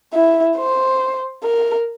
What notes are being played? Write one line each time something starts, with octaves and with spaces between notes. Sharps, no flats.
E4
C5
A#4